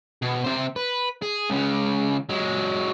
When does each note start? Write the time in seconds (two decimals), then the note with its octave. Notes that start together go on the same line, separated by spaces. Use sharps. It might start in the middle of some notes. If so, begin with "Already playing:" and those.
0.22 B2
0.44 C3 C5
0.76 B4
1.22 G#4
1.50 C#2 C#3
2.29 F#3 G#3